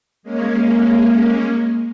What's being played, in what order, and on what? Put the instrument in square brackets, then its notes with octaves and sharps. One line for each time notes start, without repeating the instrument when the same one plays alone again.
[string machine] G#3 A#3 C#4